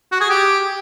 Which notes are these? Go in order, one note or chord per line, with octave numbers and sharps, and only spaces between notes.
F#4
G#4
G4